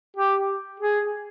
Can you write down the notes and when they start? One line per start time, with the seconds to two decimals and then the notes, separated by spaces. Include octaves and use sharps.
0.17 G4
0.80 G#4